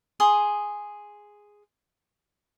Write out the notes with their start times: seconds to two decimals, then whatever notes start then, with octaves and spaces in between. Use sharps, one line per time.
0.20 G#4 C6 D#6